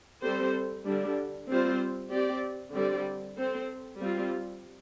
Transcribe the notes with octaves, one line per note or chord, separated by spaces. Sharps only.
G3 C4 A4 C5
D3 G3 D4
G3 C4 F4 C5
C4 G4 D5
D3 G3 C4 G4 D5
C4 A4 C5
G3 C4 F4